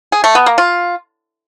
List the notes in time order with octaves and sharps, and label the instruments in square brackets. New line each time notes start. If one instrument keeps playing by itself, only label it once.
[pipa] G#4
A3
B3
A#3
F4